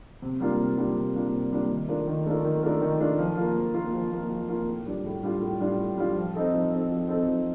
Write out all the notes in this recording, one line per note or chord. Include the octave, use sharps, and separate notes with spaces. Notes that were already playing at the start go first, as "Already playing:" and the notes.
C3
G3 A#3 D4 F4
C3
G3 A#3 D4 F4
C3
G3 A#3 D4 F4
C3
G3 A#3 D4 F4
D#3
A3 D4 F4 A#4
D#3
A3 D4 F4 A#4
D#3
A3 D4 F4 A#4
D#3
A3 D4 F4 A#4
F3
A#3 F4
F3
A#3 F4
F3
A#3 F4
F3
A#3 F4
A2
G3 D4 F4
A2
G3 D4 F4
A2
G3 D4 F4
A2
G3 D4 F4
F3
C4 D#4 A4
F3
C4 D#4 A4
F3
C4 D#4 A4
F3